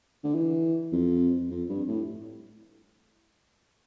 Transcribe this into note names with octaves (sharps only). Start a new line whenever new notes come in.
D3
E3
F2
F2
G2
A2